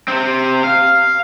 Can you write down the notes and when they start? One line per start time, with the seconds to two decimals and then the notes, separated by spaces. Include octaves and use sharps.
0.08 C3 C4
0.64 F5